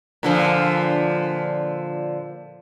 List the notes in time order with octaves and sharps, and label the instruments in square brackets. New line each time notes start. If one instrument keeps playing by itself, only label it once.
[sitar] A#2 D3 F3